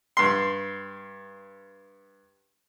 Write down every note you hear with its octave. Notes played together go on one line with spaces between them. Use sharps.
G2 C6